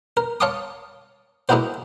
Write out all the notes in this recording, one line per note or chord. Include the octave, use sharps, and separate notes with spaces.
A#4
C#5 F5 A5 C6 D6 D#6
G#3 A#3 D#4 E4 F#4 C5